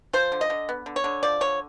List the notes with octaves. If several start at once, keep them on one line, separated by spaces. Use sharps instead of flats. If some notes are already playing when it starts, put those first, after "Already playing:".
F3 C5
D3
D#5
D3
B3
D3
C#5
D3
F3 D5
D3 C#5